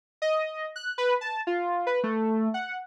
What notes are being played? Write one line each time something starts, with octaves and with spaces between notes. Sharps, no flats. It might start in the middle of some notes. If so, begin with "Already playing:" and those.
D#5
F#6
B4
A5
F4
B4
A3
F#5